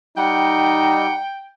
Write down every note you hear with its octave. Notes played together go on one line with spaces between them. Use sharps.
G3 D#4 F#5 G5